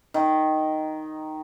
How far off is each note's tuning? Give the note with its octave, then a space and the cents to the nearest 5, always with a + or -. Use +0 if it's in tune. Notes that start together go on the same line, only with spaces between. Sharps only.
D#3 +0